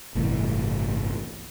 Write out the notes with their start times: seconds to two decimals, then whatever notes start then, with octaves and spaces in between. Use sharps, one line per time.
0.15 G1 C2 A2 E3